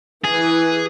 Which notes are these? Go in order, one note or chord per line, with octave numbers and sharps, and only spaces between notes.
E3 G#4 B4